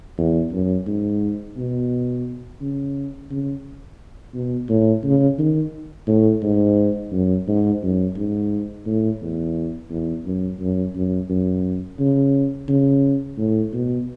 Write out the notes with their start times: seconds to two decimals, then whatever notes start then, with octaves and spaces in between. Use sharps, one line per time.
0.18 E2
0.52 F#2
0.87 G#2
1.57 B2
2.61 C#3
3.31 C#3
4.34 B2
4.69 A2
5.04 C#3
5.38 D#3
6.08 A2
6.42 G#2
7.12 F#2
7.47 G#2
7.82 F#2
8.16 G#2
8.86 A2
9.22 E2
9.90 E2
10.25 F#2
10.60 F#2
10.95 F#2
11.29 F#2
11.99 C#3
12.69 C#3
13.38 A2
13.73 B2